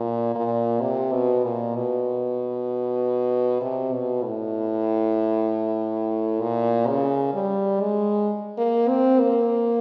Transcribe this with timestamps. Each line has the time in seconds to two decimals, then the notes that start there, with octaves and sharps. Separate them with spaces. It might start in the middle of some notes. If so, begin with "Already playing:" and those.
Already playing: A#2
0.35 A#2
0.81 C3
1.12 B2
1.44 A#2
1.75 B2
3.61 C3
3.92 B2
4.24 A2
6.41 A#2
6.88 C#3
7.34 G3
7.81 G#3
8.58 A#3
8.89 C4
9.20 A#3